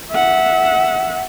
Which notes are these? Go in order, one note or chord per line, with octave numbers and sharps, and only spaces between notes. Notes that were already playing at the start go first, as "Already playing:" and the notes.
E5 F#5